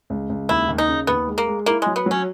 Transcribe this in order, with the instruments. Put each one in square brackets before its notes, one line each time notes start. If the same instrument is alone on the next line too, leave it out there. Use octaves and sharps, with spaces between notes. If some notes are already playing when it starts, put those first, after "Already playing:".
[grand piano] C#2
C#2
[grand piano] D#2 [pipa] E4
[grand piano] D#2
[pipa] D#4
[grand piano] C#3
[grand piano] D#2 [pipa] B3
[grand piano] G#3
[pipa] A#3
[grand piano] G#3
[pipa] A#3 [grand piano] E4
[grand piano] F#3 [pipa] G#3
[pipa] B3
[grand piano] F#3 [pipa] C#4